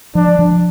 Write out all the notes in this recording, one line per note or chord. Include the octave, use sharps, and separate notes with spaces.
F3 D4
F3